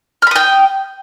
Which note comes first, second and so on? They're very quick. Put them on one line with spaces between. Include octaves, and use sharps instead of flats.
F6 B5 D#6 G5